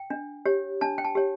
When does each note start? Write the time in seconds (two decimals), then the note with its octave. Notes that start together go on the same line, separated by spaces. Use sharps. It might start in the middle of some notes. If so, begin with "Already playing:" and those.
Already playing: G5
0.10 D4
0.45 G4 C#5
0.81 D4 A5
0.98 G5
1.05 A5
1.15 G4 C#5